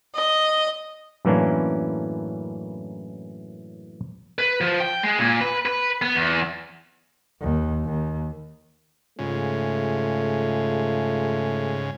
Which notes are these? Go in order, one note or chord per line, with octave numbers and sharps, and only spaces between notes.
D#5
F#2 A2 E3 A#3 C#4 D4
B4
F3
G5
G#3
A#2
B4
B4
B3
E2
D#2
D#2
G#2 C#3 A3 F4